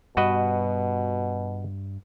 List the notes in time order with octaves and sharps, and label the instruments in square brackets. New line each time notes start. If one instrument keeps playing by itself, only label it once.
[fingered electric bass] G2 [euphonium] B2 [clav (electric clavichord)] F#4 B4 D#5